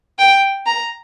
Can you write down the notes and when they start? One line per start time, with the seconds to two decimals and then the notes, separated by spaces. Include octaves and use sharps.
0.19 G5
0.66 A#5